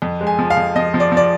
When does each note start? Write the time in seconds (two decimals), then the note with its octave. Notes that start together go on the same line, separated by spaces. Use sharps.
0.02 F2
0.21 G#3
0.27 G#5
0.39 F3
0.50 F5
0.57 F2
0.76 F3 D#5
0.94 F3
1.00 D5
1.12 F3
1.17 D5